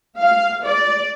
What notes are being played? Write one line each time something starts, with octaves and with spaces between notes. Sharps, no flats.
F5
D5